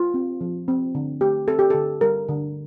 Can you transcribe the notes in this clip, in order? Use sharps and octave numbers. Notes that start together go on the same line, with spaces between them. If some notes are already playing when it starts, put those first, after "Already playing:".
Already playing: F4
C4
F3
C4
D3
A3 G4
C4 A4
G4
D3 A4
G3 A#4
D3